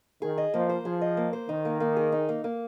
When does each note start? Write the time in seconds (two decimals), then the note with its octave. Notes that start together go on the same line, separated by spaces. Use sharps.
0.22 D#3 G#4
0.38 D#5
0.54 F3 A#3
0.69 C5
0.85 F3 G#4
1.01 D#5
1.17 A#3
1.33 C5
1.49 D#3 D#4
1.65 A#3
1.80 A#3
1.96 G#4
2.12 D#4
2.29 A#3
2.44 A#3